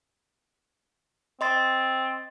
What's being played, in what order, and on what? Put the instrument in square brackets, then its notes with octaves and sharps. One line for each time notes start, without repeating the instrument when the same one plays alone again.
[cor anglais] C4 [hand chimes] D#5 C6 A6